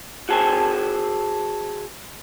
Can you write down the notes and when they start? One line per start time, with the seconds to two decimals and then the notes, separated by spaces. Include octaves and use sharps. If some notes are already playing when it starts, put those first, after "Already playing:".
0.29 F#4 G#4 A4 C5 G#5